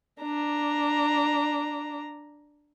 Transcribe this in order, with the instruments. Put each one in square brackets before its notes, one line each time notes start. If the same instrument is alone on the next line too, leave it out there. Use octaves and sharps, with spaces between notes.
[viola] D4 A#5